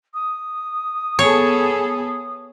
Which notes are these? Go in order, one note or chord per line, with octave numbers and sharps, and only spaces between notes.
D#6
B3 G#4 A4 C#5